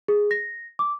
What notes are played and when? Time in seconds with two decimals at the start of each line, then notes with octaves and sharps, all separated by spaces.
0.08 G#4
0.31 A#6
0.79 D6